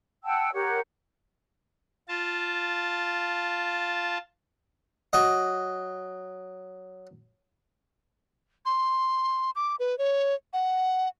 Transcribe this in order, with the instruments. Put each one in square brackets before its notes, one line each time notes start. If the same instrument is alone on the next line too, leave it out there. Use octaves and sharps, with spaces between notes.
[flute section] F#5 G5 A5 E6
G4 A#4 C#5 F#5
[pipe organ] F4 A5
[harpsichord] F#3 D#5
[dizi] C6
D6
B4
C#5
F#5